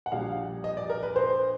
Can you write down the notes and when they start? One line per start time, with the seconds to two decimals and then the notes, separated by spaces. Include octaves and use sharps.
0.06 F#5
0.12 A#1 A#2 G3 F5
0.64 D#5
0.77 D5
0.90 A#4
1.03 B4
1.16 C5